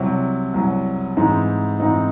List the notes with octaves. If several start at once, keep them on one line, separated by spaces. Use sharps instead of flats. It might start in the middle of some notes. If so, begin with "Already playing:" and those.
Already playing: C2 C3 F#3
C2 C3 F#3
G#2 E3 C4 D#4
G#2 E3 C4 D#4